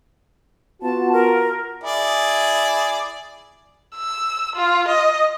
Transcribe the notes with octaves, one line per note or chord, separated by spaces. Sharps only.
B3 F4 F#4 A5
A#4
E4 G#4 D5
E6
F4
D#5